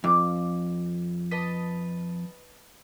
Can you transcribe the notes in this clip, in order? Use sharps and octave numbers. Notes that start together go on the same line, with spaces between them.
F2 D6
B4 D#5 A5